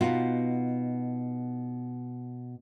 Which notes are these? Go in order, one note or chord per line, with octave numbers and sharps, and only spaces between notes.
B2 B3 D#4 F4